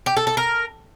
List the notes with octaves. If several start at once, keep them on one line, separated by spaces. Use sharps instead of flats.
G4
A4
A4
A#4